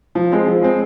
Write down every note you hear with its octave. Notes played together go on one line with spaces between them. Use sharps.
F3
G#3 C4
F3
G#3 C4